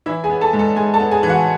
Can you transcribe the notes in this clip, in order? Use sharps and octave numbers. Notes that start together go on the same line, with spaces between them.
E3 E4 E5
G#4 G#5
B3
A4 A5
G#2
A4 A5
G#2 G#4 G#5
A4 A5
B3
G#4 G#5
E3
F#4 F#5